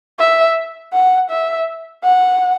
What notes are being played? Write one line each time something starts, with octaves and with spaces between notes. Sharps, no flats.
E5
F#5
E5
F#5